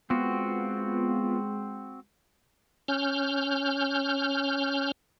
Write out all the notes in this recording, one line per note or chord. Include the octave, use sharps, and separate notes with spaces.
G#3 B3 C4 F4 F#4
C#4 F6 G6